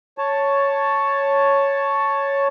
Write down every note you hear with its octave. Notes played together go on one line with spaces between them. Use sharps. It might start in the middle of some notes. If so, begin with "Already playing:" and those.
C#5 A5